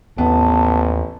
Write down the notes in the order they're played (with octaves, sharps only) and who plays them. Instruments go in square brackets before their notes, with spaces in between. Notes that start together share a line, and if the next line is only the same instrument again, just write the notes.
[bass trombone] A1 [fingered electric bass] D#2 C4 [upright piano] B3 [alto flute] A5